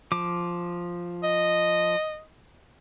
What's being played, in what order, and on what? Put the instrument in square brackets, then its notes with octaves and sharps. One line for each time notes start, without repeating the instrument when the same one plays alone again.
[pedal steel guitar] F3 D6
[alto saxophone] D#5